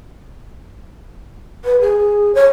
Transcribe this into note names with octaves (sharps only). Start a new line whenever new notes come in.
B4
G#4
C#5